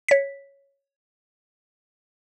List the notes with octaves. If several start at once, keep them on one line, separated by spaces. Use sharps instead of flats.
C#5 B6